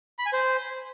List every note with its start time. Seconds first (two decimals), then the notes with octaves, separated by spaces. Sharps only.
0.19 B5
0.26 G#5
0.33 C5